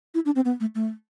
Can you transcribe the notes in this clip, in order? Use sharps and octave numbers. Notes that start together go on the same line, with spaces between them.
E4
D4
C4
B3
A3
A3